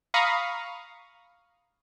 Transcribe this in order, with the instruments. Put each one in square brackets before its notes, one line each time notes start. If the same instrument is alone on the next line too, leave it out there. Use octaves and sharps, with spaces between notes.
[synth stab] F5 A#5 B5 C#6 D#6